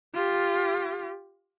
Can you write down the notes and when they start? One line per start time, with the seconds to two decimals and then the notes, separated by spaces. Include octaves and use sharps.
0.15 F4 G4